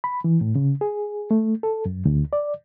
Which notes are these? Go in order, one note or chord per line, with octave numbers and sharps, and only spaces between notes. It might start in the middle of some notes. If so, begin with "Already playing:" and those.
B5
E3
A2
C#3
G#4
A3
A4
F#2
D2
D5